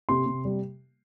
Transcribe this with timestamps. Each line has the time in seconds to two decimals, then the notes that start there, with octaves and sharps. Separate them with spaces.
0.09 C3 C6
0.26 C3
0.45 G3